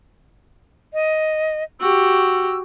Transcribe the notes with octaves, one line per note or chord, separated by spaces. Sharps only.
D#5
F#4 G4 E6